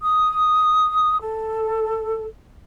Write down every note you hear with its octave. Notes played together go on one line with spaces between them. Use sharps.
D#6
A4